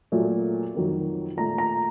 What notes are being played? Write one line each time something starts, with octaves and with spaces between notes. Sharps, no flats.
A#2 F#3 A3
F2 D#3 F#3
A#2 A3 A#5
A#5